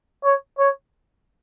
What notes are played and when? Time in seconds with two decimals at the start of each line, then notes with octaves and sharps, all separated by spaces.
0.24 C#5
0.59 C#5